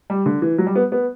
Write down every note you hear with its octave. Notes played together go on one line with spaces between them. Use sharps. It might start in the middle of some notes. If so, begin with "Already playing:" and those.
G3
D3
E3
F#3
G3
B3
B3